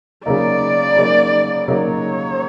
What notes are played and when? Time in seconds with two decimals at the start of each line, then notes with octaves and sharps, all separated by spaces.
0.25 C#3 F#3 A#3 D#4 D5
0.96 C#3 F#3 A#3 D#4
1.68 C#3 F#3 A#3 D#4 C#5